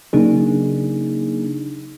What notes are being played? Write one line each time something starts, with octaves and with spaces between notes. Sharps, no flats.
C#3 F#3 A#3 D4 D#4 G#4